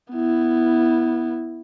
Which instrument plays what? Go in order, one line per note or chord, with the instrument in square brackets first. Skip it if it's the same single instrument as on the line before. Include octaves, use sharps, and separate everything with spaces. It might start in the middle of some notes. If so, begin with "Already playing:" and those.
[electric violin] B3 E4